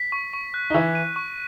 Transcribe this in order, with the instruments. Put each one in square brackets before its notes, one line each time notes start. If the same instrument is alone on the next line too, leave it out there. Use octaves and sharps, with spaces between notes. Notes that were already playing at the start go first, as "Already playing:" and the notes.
Already playing: [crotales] B6
C#6
C#6
F#6
[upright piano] D#4
[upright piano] E3 E4 [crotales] C#6
[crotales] D#7
C#6